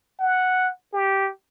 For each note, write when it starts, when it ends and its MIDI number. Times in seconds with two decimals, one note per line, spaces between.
0.20 0.70 78
0.93 1.30 67